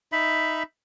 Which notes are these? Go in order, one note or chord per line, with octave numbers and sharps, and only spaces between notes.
D#4 E5 B5